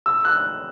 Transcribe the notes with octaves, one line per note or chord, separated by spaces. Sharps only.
E6
F#6